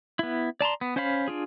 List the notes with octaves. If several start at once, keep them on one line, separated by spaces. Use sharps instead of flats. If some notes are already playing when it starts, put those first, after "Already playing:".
B3 E4
D5 A5 A#5 C6
B3
C#4 C5 C#5 F5 B5
D4 F4 G#4